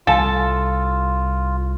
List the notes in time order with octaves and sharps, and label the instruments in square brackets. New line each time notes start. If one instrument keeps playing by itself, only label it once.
[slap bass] C2 [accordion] F4 [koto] A4 [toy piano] F5 G#5 A5